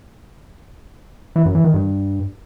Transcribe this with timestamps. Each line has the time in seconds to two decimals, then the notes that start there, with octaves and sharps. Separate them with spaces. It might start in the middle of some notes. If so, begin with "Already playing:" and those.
1.36 E3
1.45 F#2
1.55 E3
1.64 D#3
1.74 G2